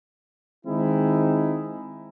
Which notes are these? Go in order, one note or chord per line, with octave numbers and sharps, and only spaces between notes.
D#3 G#3 C4 D#4 E4